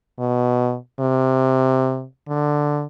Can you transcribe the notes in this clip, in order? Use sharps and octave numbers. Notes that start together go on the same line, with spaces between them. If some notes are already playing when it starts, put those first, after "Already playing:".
B2
C3
D3